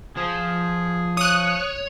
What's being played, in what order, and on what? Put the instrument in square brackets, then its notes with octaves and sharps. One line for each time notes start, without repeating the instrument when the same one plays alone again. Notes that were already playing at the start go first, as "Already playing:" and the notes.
[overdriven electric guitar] F3 [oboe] G#4
[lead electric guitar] C#5 [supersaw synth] D#6 F#6